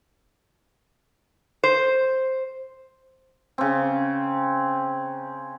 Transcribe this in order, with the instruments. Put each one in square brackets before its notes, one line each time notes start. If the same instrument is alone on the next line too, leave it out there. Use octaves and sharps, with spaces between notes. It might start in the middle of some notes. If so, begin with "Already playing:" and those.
[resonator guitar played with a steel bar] C5
[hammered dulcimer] C#3 C4